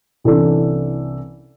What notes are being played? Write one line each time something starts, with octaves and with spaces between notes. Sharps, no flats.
C2 E3 C#4 D4 A4